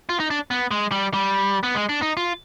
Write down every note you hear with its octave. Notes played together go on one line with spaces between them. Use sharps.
F4
D#4
D4
B3
G#3
G3
G3
B3
G#3
D4
D#4
F4